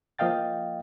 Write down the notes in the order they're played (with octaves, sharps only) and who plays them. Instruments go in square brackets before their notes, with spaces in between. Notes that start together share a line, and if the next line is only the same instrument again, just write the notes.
[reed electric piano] F3 A#3 D#5 F5 G5 A6